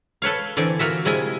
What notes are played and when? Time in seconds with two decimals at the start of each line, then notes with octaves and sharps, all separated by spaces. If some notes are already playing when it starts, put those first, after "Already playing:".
0.22 A4 B4 C#5 F5
0.57 D3 E3 C4 D5 G#5
0.79 A#3 F4 F#4 E5
1.05 C3 G#3 E4 F4 D#5 G#5